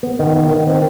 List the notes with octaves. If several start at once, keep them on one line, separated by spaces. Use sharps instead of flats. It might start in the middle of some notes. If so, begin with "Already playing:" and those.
B3
D#3
B3
D#3
C4